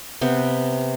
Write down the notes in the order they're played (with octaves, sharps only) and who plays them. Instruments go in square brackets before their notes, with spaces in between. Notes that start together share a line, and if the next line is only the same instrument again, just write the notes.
[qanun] C3 B3 C4